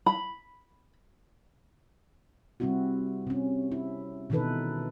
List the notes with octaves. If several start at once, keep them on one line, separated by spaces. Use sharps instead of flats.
B5
C3 G3 C4 E4 F#4
C3 C#4
E4
B2 D#3 E3 D#4 A4 B4